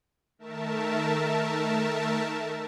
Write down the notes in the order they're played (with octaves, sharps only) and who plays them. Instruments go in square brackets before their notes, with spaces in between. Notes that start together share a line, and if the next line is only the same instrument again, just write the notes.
[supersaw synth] D#3 A3 A#4 E5 A5